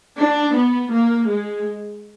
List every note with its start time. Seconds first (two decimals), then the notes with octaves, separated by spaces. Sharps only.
0.18 D4
0.55 B3
0.93 A#3
1.30 G#3